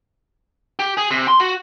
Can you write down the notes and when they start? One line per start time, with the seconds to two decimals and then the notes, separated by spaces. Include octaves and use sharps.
0.79 G4
0.97 G#4
1.11 C3
1.28 C6
1.40 F#4